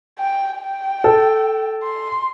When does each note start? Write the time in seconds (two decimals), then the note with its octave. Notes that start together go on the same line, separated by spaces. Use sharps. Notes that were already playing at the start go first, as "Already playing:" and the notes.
0.20 G5
0.58 G5
1.04 A4
1.84 C6